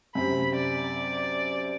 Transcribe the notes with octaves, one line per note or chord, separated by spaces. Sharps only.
F#2 C3 B5
D5